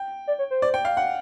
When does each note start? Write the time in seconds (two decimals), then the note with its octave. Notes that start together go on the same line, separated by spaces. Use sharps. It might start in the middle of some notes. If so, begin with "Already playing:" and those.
Already playing: G5
0.27 D5
0.39 C#5
0.51 C5
0.62 D5
0.74 G5
0.85 F5
0.97 F#5